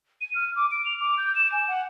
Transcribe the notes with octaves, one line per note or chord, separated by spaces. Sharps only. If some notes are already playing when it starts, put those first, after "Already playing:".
D#7
F6
D6
D7
F7
D6
G6
E7
G#5
F#5